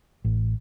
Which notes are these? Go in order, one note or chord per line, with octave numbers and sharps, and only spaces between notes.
A1